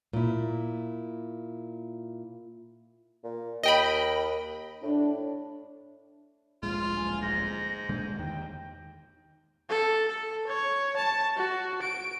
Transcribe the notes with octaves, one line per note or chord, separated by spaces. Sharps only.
A#2 E4
A#2
D#2 D#5 G5 B5
A2 D4
D1 A#1 G#3 F4
G#5
G#2 A#6
A#2 D3 G#3 G6
E2 D#3 G5
A4
A4
C#5
A5
F#4
D7